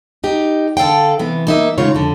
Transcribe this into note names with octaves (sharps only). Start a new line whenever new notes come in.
D#4 G4
D3 A4 F5 G5
C3 E3 B3
A#3 D#4 E5
G#2 C#3 F4 C#5
F2 D3